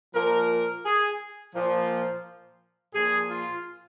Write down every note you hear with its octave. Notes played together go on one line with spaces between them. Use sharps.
A#2 F3 A#4
G#4
A#2 F3
A#2 F3 G#4
F4